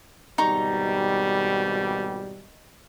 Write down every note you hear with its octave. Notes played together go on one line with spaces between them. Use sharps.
G#1 B2 G3 D#4 A#5 C#6